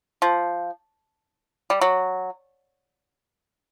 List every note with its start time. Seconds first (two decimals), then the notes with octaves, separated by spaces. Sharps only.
0.22 F3
1.70 G3
1.81 F#3